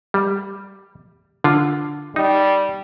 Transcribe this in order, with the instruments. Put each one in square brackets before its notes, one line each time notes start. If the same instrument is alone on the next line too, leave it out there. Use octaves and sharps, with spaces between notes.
[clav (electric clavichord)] G3
D3 F4
[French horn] G3 [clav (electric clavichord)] D#4